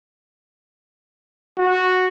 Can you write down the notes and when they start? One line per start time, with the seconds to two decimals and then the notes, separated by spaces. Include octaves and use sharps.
1.58 F#4